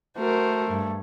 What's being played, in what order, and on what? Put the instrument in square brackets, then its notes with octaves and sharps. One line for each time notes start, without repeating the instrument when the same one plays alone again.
[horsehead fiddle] A3 [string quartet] F#4 A#4 C5
[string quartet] G2